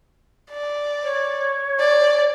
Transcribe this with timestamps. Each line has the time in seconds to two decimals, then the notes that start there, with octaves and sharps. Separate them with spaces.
0.51 D5
1.03 C#5
1.79 D5